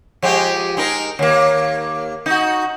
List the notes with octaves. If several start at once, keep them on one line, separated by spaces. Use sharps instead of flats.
F3 G#3 G4
G#3 D#4 A#4
D#2 A#3
D#4 F#4